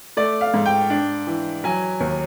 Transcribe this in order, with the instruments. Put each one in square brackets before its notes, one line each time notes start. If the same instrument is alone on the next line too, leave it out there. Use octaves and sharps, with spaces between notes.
[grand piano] A3 D5
F5
G#2
G5
D4
E3
F#3 G#5
D#2